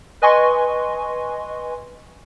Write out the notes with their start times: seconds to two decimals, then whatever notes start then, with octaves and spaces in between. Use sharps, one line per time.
0.22 B4 D#5 G#5 C6 C#6